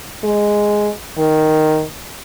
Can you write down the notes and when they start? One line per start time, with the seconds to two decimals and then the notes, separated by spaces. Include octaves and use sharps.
0.24 G#3
1.18 D#3